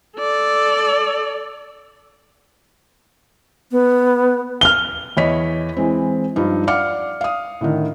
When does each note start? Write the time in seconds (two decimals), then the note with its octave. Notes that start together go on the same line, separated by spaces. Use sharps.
0.19 A4 D5
3.72 B3
4.61 F6 G7
5.17 E2 E4 C#5 D#5 B6
5.77 E3 G#3 C4
6.36 G2 F3 D#4
6.67 D5 F5 F#5 D6 F6 C#7
7.21 F5 D#6
7.61 A2 D3 D#3